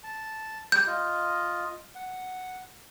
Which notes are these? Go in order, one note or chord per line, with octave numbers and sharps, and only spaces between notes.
A5
G3 G5 G6
F4 D#5
F#5